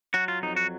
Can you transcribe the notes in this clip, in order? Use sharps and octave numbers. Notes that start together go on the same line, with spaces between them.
F#3 F#4
F4
F2 D#4
F#4